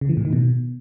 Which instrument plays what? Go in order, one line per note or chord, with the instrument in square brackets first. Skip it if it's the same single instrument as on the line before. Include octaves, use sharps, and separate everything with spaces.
[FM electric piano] C#3
E3
A2
D#3
B2